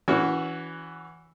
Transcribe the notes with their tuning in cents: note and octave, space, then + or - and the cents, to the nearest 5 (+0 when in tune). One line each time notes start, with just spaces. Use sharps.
E3 +0 C#4 +35 F#4 +0